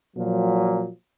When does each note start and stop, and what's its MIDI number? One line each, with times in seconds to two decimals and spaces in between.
0.17 0.88 46
0.17 0.88 53
0.17 0.88 54